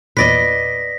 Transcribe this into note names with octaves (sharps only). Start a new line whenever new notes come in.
E2 A#2 B4 D5 D#5 A#6 B6